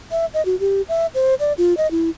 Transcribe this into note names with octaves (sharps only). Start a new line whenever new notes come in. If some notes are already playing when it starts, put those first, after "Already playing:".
E5
D#5
F#4
G4
E5
C5
D5
F4
D#5
E4